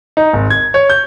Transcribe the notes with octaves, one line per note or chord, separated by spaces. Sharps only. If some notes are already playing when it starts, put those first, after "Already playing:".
D#4
G#1
G#6
C#5
G6